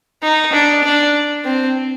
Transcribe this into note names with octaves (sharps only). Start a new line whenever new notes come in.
D#4
D4
D4
C4